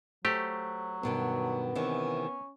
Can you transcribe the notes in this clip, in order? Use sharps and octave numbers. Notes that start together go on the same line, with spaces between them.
F#3 A3 G4 C5
G2 B2 D#3 B3
C3 D#3 E3 C#4